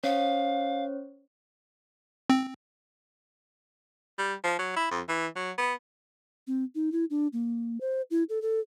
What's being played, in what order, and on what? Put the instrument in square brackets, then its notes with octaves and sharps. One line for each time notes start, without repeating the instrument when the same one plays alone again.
[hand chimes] C#4 C5 C#5 [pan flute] F5
[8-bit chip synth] C4
[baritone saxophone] G3
F3
F#3
E4
F2
E3
F#3
B3
[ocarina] C4
D#4
E4
D4
A#3
C5
E4
A4
A4